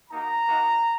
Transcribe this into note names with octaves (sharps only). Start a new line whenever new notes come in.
A#3 D#4 F#4 A#5
A#3 D#4 F#4